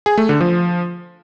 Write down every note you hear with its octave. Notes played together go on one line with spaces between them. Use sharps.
G#4
A3
D3
F3